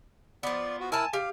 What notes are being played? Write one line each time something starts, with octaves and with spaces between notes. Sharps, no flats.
F3 B3 D5
F#4
E4 A#4 G#5 A5 E6
G4 F5